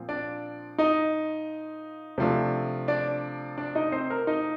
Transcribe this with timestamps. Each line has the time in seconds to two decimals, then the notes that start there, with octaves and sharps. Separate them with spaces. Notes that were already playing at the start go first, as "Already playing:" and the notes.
Already playing: A#2 F3 C4
0.09 D4 D5
0.78 D#4 D#5
2.18 C3 F3 A3 D4
2.88 D4 D5
3.58 D4 D5
3.75 D#4 D#5
3.92 C4 C5
4.10 A#4
4.27 D#4 D#5